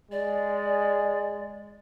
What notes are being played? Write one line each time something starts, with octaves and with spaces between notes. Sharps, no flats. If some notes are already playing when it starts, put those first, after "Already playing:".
G#3 D5